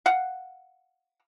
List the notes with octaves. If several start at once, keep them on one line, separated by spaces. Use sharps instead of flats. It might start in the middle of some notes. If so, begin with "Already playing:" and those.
F5 F#5